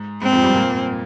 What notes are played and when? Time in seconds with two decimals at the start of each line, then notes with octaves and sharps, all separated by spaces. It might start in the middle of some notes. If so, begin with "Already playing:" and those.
Already playing: G#2
0.22 G#2 C4
0.32 F2 F3
0.43 G2 G3
0.54 A#2 A#3